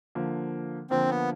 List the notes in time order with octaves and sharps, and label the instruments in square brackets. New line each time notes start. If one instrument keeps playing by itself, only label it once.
[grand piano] D3 F3 A#3
[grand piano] D3 F3 A#3 [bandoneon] C4
[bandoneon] B3